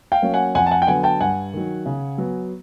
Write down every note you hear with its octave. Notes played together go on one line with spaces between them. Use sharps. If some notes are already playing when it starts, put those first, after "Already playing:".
F5 G5
F#3 A#3 C#4
F#5 G#5
F2 F#5 G#5
A5
F#5 G#5
G5
D3 F#3 B3 F#5 G#5
G5 A5
G2 F#5 G#5
D#3 F#3
C#3
F#3 B3